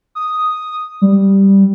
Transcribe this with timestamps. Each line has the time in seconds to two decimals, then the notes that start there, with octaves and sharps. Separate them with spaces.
0.15 D#6
1.02 G3